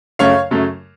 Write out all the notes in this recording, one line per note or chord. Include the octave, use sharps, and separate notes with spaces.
F#2 C#3 F#3 A3 C#5 F5
F#2 C#3 F#3 A3